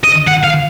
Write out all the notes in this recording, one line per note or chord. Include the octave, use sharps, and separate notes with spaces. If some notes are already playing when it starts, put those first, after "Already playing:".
D#5
F#5
F5